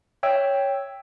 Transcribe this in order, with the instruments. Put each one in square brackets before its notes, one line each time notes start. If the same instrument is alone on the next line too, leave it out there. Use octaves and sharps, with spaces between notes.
[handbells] C#5 E5 G5 E6